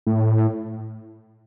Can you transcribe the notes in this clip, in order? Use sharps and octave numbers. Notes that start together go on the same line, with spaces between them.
A2